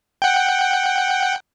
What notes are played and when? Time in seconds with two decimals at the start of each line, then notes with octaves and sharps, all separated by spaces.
0.22 F#5 G5